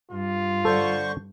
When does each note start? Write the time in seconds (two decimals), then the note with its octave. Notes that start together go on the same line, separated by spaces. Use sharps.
0.12 G2 F4
0.65 D3 A4 C5 C#6